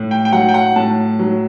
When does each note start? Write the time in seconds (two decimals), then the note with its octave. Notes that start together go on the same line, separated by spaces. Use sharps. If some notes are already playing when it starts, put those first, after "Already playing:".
Already playing: A2
0.11 G5
0.25 G5
0.32 F#3 F#5
0.49 G5
0.54 F#5
0.76 A2 A5
1.19 F#3